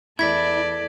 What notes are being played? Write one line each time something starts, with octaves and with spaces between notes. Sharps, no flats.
E2 E4 A4 D5 G#6 B6